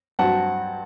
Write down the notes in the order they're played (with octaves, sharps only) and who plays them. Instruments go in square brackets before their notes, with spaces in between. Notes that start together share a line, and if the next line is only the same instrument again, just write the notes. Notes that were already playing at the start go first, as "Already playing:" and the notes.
[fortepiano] G2 F#3 C4 F#4 [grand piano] F#5 A5